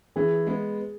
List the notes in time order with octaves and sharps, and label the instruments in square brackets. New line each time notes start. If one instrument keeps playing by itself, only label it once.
[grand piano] E3 [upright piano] G#4
[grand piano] G#3 B3